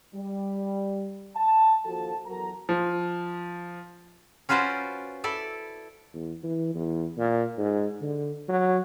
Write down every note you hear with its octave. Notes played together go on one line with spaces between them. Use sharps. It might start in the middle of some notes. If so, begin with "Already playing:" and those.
G3
A5
D#2 F3 F#4 A4 A5
E2 F#3 A4 A#4 A#5
F3
C#4 F4 F#4 B4 C5 D5
E4 A4 D5
E2
E3
E2
A#2
G#2
D3
F#3